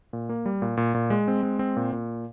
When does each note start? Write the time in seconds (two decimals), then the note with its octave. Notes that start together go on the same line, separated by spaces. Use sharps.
0.13 A#2
0.29 A#3
0.46 G3
0.62 A#2
0.77 A#2
0.95 A#2
1.10 G#3
1.28 C4
1.43 G#3
1.59 C4
1.77 A#2
1.93 A#2